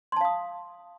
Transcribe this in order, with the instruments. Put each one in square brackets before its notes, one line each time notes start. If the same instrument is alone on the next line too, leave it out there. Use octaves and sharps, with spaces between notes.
[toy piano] C6
A5
F5
D#6